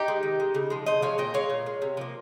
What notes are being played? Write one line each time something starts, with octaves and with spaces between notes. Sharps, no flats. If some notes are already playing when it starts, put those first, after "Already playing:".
Already playing: D#4 G4
G#3
D#3
G#3
C#3
F3 G#3
C#3 C5 D#5
F3 G#3 C#5 F5
A#2 D#5 G5
G#3 C#5 F5
A#2
G#3
C3
F3 A#3